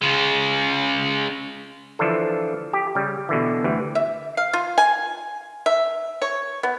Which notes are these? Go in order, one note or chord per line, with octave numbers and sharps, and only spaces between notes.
C#3 G#3
D3 E3 F3 D4 F4 A4
G4
C#3 G3
B2 D3 E3
D2 E3 G3
E5
F5
F4
G#5
E5
C#5
B3